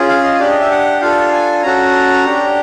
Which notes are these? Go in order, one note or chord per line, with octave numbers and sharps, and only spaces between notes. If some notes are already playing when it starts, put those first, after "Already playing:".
Already playing: C#4 F4 G#4
F5
D#5
D4 G4 D5
D#5
E5
F#5
D4 F4 A4 F5
G#5
C#4 F#4 A4 A#5
D4 G4